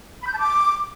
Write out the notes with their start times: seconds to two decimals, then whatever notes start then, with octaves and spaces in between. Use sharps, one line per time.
0.22 B5
0.28 G6
0.34 A5
0.40 D6